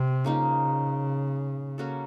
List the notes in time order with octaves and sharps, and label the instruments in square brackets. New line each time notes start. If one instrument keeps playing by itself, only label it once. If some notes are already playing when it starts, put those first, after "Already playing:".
Already playing: [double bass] C3
[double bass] C#3 [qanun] F3 A#3 D#4
[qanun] A#3 C#4 F#4 A4